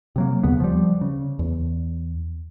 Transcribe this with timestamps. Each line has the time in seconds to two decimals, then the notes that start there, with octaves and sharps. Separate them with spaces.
0.16 C3 F#3 A#3
0.43 D#2 C#3 B3
0.60 F3 G3
1.01 C#3
1.39 E2